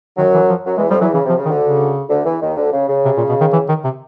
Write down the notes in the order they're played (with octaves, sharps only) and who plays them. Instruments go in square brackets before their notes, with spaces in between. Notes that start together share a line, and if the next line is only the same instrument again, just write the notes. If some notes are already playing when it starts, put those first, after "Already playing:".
[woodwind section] F#2 F#3 [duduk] D#3
[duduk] E3
F3
[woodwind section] F#2 F#3
[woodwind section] E2 E3 [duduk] G#3
[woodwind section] F2 F3 [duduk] G3
[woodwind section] E2 E3 [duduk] F#3
[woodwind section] C#3 [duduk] E3
[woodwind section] C3
[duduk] F3
[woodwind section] C#3
[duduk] D#3
[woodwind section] D2 D3
[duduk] C#3
[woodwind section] D2 D3
E2 E3
D#2 D#3
D2 D3
C#3
C#3
[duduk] C3
A#2
B2
D#3
E3
D#3
C3